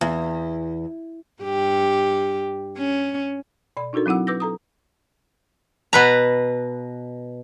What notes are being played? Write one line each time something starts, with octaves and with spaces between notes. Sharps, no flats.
E2
G2 G4
C#4
B2 D5 B5
D4 D#4 F#4 A4 A#4
F#3 C4 E4 F#5 E6
B4 D6 E6 G6 A#6
A4 A#5 D#6
B2 B4 A#5